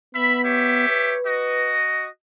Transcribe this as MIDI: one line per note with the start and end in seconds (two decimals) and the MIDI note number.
0.14 0.89 59
0.14 0.39 76
0.14 0.39 83
0.43 1.16 67
0.43 1.16 73
0.43 1.16 76
0.89 1.76 71
1.25 2.07 66
1.25 2.07 75